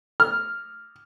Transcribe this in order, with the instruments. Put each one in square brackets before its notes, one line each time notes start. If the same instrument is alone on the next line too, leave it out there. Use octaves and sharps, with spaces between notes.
[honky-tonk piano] F6